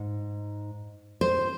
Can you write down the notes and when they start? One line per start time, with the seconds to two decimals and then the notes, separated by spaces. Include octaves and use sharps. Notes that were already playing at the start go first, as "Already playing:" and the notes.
Already playing: G#2
1.21 C5